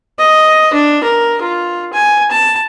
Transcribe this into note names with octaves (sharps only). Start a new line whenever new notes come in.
D#5
D4
A#4
F4
G#5
A5